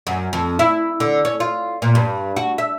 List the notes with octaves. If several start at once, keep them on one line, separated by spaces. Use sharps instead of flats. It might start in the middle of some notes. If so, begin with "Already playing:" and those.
F#2
F2
E4
D3
C#4
F4
A#2
G2
F#4
E5